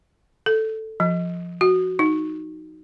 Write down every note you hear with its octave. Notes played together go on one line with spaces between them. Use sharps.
A4
F3
F#4
D#4